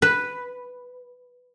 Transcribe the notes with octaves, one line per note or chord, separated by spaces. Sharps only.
B4